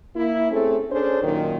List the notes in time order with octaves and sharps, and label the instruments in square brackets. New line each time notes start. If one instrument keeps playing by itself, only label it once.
[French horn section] A#3 E4
A3 C4 C#4 G#4 A4
C#4 D4 G#4 A4 C5
F#2 A#2 D#3